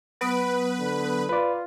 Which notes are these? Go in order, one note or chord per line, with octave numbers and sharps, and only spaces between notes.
F#3 B3 B4 D#6
D3
F4 B4 D5